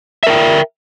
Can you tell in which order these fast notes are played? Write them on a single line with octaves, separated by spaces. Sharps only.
E5 A#4 G5